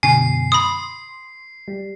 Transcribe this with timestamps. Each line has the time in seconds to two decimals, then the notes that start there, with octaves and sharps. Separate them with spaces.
0.03 F#2 B2 D3 G#5 C7
0.52 B5 C6 D#6
1.68 G3